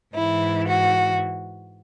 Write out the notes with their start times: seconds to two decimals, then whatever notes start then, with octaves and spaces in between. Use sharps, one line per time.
0.15 G#2 E3 E4
0.67 F#4